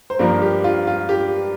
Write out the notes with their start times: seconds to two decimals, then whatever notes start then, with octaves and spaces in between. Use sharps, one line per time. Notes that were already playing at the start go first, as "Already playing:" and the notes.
0.10 C5
0.19 G2 F3 A#3 A#4
0.42 G4
0.64 F4
0.87 F4
1.09 G4